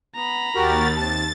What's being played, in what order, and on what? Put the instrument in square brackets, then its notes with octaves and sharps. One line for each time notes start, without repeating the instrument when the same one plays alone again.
[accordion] B3 [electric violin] A#5 B5
[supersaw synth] D#2 A6 [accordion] F#4 G4 A#4
[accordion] C3 A5 [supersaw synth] A6